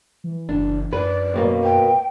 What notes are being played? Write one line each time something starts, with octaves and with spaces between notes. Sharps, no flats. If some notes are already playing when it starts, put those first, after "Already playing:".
E3
F#1 D4
F#2 B4 D5
D#2 B2 A#3 D6
B4 G5